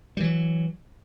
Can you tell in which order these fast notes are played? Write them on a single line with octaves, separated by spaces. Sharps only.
G3 E3 F#3